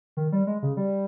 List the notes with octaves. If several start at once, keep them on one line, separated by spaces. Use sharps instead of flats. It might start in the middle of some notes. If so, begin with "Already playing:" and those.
D#3
G3
G#3
C#3
G3